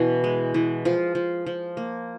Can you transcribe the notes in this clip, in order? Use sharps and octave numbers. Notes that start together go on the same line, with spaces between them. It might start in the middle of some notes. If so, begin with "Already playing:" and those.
Already playing: B2 E3
G#3
E3
F3 F4
F3
F3
A#3